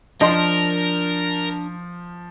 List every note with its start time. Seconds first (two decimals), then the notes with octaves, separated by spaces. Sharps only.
0.21 F3 D4 A#4 D#5 G5 C6